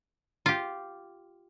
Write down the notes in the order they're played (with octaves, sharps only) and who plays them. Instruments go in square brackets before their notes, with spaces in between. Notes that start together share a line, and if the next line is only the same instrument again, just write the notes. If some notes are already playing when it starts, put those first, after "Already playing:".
[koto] F4 G4